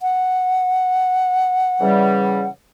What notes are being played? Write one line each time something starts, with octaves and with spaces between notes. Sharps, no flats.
F#5
C#3 E3 G3